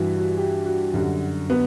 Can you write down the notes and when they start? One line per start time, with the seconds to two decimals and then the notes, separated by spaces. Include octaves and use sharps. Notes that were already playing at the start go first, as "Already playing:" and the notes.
Already playing: G2 E3 G3 F#4
0.18 F#4
0.37 G4
0.66 F#4
0.94 F#2 D3 G3 F#4
1.50 B3